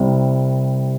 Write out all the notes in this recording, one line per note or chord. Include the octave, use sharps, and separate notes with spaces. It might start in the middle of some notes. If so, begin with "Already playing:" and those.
Already playing: C2 C3 G3